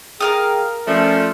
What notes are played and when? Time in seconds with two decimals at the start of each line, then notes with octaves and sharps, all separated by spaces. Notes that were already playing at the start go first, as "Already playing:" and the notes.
0.20 G#4 A#4 F5 G5 D#6
0.88 F3 A3 C#4 D5